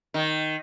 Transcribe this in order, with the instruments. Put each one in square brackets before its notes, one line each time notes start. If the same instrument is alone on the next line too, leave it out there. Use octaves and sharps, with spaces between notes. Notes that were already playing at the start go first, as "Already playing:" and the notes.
[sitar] D#3